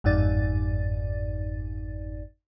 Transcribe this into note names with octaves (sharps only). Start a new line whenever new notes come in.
G1 F2 G#2 D#4 D5 A6